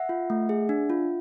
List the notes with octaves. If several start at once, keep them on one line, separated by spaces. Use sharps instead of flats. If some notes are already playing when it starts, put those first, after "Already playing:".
Already playing: E5 F#5
F4
A3
G#4
D4
F4